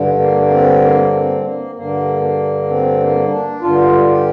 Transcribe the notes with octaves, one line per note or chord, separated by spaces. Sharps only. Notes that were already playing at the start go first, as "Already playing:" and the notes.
Already playing: G2 D3
A#3
A#3
C4
A#3
C4
A#3
G2 D3 A#3
A#3
C4
A#3
D4
G2 D3 F4
G4